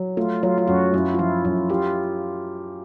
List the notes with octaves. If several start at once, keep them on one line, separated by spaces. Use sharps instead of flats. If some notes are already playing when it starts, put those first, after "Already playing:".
Already playing: F#3
A3 F4
F#3 F4
F4
F#2 F#4
F#2 E4
F4
F3 E4
F#2 E4
F4 G4